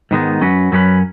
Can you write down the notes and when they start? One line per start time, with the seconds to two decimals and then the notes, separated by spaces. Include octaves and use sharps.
0.11 G#2 D#3 G#3 B3 D#4
0.41 F#2 F#3 C#4 F#4 B4
0.72 F#2 F#3 C#4 F#4 B4